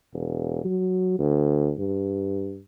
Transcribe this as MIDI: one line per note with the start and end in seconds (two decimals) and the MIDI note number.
0.14 0.62 28
0.65 1.14 54
1.19 1.73 38
1.78 2.60 43